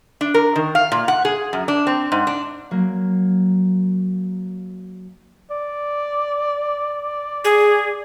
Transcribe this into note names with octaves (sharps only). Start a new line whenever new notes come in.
D4
A#4
D#3
F5
A#2
F#5
G#4
F#2
D4
C4
G#2
D4
F#3 A#3
D5
G#4